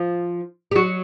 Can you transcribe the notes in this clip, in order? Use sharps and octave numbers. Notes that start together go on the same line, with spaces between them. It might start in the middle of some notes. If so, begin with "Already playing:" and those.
Already playing: F3 F4
G4
F#3 F#4